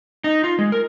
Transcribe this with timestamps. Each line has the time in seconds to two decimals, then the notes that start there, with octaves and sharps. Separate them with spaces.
0.24 D#4
0.44 F4
0.59 G#3
0.72 A#4